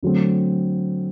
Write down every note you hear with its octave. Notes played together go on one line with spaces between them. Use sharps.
D3 F#3 A3 C4